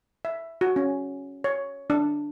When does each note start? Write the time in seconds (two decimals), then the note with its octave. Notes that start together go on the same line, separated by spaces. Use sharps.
0.25 E5
0.61 F#4
0.76 C#4
1.44 C#5
1.90 D4